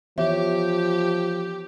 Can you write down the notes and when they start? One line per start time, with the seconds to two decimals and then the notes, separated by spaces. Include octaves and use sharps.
0.18 E3 F3 B3 G4 C#5 E5